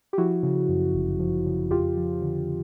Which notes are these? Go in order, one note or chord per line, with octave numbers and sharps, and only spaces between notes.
G4
F3 E4 F#4
C#3
F#2
G1
F3
C#3
F2 F4 G4
F3
D3